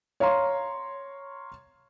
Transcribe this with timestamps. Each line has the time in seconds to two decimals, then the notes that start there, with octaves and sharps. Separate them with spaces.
0.20 C#5 F5 A#5 C6